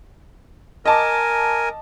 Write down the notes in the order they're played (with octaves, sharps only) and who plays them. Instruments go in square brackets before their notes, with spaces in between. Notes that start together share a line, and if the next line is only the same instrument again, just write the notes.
[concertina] A#4 G#5 [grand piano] D#5 A5 D6